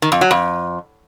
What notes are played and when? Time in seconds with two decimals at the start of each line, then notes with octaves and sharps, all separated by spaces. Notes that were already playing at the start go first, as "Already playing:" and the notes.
0.02 D#3
0.12 F2
0.21 F#3
0.31 F2